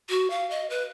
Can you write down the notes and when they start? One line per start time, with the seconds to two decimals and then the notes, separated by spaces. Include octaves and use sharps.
0.10 F#4
0.30 F5
0.50 D#5
0.70 B4